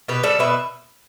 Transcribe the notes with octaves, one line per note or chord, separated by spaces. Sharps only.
B2 G4 B4
G3 A4 D5
B2 B4 E5